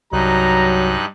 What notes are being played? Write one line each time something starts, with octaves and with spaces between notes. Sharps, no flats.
C2 G2 F#3 D#4 A#5 F#6